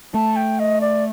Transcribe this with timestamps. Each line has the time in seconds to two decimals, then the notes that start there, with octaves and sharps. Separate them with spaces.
0.14 A3 A5
0.36 G5
0.59 D#5
0.81 D5